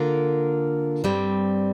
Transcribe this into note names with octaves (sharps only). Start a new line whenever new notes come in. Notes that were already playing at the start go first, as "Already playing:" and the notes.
Already playing: D3 A#3 F4 A#4
G2 G3 C4